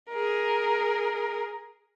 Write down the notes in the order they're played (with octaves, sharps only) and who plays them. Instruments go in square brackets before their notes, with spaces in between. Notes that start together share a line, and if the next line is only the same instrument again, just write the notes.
[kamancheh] G#4 A#4